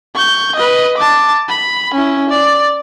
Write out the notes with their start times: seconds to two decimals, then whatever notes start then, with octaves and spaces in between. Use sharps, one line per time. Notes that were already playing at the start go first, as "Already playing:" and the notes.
0.15 C#6 G6
0.56 B4 D#5
0.97 A5 D6
1.48 B5
1.94 C#4 E4
2.29 D5